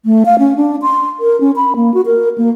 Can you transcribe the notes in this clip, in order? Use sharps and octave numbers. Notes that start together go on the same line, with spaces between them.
A3
F5
C#4
D4
C6
A#4
C#4
B5
A#3
F#4
A#4
A#3